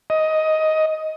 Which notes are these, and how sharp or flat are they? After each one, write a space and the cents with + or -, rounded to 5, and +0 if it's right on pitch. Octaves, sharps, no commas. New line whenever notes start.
D#5 +10